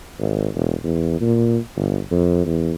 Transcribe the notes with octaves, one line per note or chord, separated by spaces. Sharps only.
G#1
E1
E2
A#2
G1
F2
E2